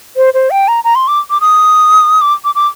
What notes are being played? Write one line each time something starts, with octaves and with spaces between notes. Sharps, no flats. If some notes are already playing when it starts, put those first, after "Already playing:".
C5
C5
G5
A#5
A#5
C6
D6
D6
D#6
D6
D6
D6